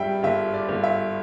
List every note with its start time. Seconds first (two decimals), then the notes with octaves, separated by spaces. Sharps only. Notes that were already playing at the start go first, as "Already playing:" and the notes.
Already playing: G2 G3 E5 G5
0.23 G1 E5
0.54 D5
0.68 G1
0.84 E5